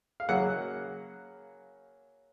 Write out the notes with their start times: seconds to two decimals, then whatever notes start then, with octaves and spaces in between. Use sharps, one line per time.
0.20 F5
0.29 C#3 F#3 A#3 F#5